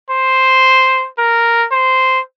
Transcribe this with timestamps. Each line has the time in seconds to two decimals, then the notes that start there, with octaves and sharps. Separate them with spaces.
0.10 C5
1.18 A#4
1.72 C5